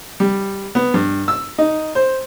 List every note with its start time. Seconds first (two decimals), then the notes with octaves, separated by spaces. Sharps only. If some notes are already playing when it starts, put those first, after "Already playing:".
0.20 G3
0.75 B3
0.94 G2
1.28 E6
1.58 D#4
1.95 C5